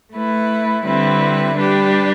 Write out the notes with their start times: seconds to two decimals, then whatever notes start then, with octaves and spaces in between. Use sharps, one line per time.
0.14 A3 E4 B4
0.85 D3 G3 C4 E4 B4
1.56 G3 D4 G4 B4